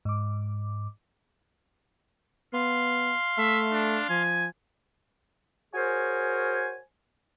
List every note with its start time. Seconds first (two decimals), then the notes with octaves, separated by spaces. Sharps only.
0.05 G#2 D6
2.53 B3 F5 C6
3.38 A3 E5
3.72 D4
4.09 F3 G#5
5.74 F#4 G#4 A#4 C5 C#5 G#5